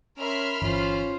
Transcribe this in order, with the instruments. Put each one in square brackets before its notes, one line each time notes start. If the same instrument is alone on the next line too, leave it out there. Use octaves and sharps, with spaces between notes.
[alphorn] C#4 [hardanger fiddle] A#4 E5 [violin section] B5 C6 F6
[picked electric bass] G1 E3 [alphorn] C#4 [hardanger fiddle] F4 C5